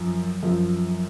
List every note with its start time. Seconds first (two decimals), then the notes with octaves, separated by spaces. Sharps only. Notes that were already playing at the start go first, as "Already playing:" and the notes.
Already playing: F#2 F3
0.43 F#2 F3